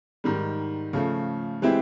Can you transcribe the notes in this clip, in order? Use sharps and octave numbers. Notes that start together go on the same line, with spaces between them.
G#2 D#3 G3
C#3 F3 A3
E3 G#3 C4 E4 G4